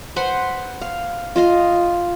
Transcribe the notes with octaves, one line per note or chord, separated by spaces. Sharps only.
B4 C5 F#5 C6
F5
F4 D#5 F5